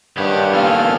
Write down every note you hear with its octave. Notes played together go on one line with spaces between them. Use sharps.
G2 D#3 G4 C#5 F#5 B5
D#2 F3 A#3 B3 F4 A4 G#5 F6